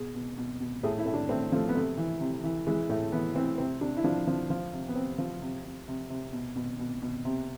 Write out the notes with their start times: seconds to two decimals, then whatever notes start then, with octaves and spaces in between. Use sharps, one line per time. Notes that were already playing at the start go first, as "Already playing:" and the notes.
Already playing: B2 G#4
0.15 B2
0.38 B2
0.61 B2
0.83 A2 G#4
0.98 E4
1.06 A2
1.14 D4
1.29 A2 C4
1.52 F3 A3
1.69 B3
1.75 C3 A3
1.98 E3
2.21 C3
2.44 E3
2.67 E3 G#3
2.89 A2 A3
3.12 E3 B3
3.35 E3 C4
3.58 C3 C4
3.81 C3 D4
3.97 E4
4.04 F3 D4
4.27 F3
4.50 F3
4.73 C3
4.89 B3
4.96 C3 C4
5.18 F3
5.42 C3
5.64 C3
5.88 C3
6.10 C3
6.33 B2
6.56 B2
6.79 B2
7.02 B2
7.25 C3